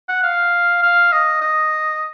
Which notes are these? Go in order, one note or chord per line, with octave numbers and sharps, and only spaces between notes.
F#5
F5
F5
D#5
D#5